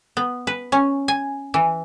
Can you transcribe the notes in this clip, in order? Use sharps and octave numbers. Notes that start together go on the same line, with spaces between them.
B3
B4
C#4
G#5
E3